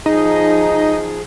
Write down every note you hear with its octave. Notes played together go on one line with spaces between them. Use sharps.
F3 D#4 G#4 D#5